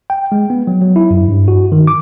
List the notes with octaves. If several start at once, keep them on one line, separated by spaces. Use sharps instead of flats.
G5
G#3
B3
F#3
F#3
E4
F#2
G2
F#4
D#3
D6